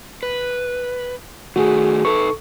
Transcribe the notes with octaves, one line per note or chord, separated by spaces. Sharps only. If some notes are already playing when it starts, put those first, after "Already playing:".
B4
D#3 A3 F#4 G#4
D#4 A4 B4 C#6